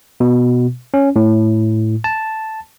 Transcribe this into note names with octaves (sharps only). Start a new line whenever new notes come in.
B2
C#4
A2
A5